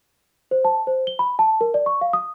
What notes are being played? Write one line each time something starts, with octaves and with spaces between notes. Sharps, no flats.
C5
A5
C5
G7
B5
A5
A#4
D5
C#6
F5
D#6